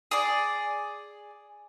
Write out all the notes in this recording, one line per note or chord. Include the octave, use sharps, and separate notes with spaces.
G#4 D5 D6